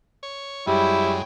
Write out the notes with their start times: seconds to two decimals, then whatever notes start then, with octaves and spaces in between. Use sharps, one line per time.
0.23 C#5
0.67 F#2 G3 G#3 E4 C#5 G5